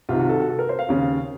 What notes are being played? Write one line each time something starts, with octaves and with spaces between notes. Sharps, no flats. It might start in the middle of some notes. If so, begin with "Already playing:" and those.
C2 C3 D#3 F4
F#4
A4
F#4
A4
A#4
C5
F5
D#2 C#3